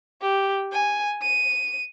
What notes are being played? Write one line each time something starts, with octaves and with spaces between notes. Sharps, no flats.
G4
G#5
D#7